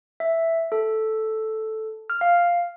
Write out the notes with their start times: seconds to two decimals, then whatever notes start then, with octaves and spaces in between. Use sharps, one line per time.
0.20 E5
0.72 A4
2.10 F6
2.21 F5